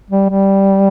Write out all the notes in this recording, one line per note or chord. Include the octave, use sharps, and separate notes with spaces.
G3
G3